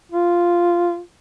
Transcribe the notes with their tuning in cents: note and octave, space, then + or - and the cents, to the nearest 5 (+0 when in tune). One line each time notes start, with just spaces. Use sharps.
F4 -5